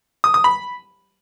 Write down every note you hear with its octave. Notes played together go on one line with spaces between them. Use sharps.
D#6
D#6
B5